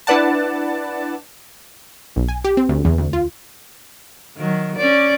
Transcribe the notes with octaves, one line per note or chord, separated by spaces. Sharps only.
D4 E4 B4 D5 F#5 A5
B1
G#5
G4
C4
D2
E2
D2
F4
D#3 F#3
C#4 D5